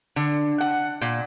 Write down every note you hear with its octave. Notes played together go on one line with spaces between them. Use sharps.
D3
F#5
A#2